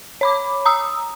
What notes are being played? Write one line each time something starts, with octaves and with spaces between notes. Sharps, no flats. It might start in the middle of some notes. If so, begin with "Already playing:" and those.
C#5 B5 D6
A#5 D#6 E6